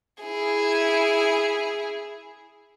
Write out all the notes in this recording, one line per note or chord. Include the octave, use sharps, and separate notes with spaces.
E4 G#4